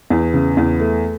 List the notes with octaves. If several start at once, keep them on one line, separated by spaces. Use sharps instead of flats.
E2
C#3
E2
A3